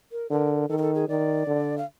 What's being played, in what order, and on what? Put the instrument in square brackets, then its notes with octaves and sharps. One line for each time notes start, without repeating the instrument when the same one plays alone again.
[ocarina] A#4
[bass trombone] D3 [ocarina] A#4
[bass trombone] D#3 [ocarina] A4
[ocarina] A#4
A4
G#4
[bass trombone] D#3 [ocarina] D5
[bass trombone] D3
[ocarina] F5